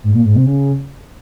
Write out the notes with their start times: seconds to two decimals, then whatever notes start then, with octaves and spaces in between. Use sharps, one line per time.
0.03 G#2
0.14 A#2
0.25 G#2
0.35 C3
0.46 C#3